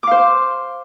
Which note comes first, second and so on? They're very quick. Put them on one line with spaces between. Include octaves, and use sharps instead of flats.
D6 F5 C5